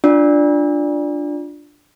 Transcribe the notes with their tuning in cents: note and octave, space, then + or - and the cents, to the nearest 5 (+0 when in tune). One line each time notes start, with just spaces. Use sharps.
D4 +5 F4 +0 D5 +0